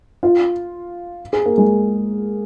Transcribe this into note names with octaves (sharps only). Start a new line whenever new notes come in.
F4
G#4
A#3
G#3